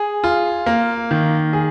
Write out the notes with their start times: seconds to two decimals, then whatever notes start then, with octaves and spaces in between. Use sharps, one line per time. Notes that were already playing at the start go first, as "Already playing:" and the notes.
Already playing: G#4
0.24 F4
0.66 A#3
1.11 D#3
1.53 G#4